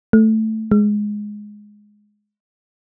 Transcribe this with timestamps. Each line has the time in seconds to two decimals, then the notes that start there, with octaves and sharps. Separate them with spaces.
0.13 A3
0.72 G#3